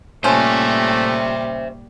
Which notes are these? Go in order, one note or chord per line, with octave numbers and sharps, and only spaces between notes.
A#2 F3 G3 A3 C#4 C5 E5